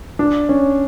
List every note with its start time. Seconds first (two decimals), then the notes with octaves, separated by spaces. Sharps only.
0.19 D4
0.49 C#4